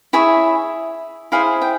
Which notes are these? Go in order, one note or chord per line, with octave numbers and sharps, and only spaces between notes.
E4 G#4 C#5 E5
E4 G#4 C5 F5
G5